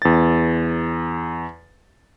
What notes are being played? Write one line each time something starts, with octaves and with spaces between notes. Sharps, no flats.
E2 A6